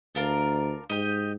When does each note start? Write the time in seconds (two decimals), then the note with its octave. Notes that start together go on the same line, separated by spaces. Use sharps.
0.15 D2 D4 F4 A#4
0.90 G#2 G4 D#5